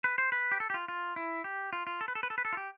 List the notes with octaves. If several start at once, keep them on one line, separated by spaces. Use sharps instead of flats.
B4
C5
B4
G4
A4
G4
F4
F4
E4
G4
F4
F4
A4
B4
A4
B4
A4
B4
A4
F4
G4